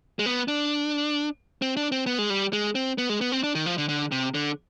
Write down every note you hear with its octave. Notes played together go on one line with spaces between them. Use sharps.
G#3
B3
D4
C4
D4
C4
B3
G#3
G3
G#3
C4
B3
G#3
B3
C4
D4
D#3
F3
D3
D3
C3
D3